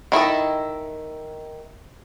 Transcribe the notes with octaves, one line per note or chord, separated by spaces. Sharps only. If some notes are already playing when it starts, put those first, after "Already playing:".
D#3 E4 A4 D#5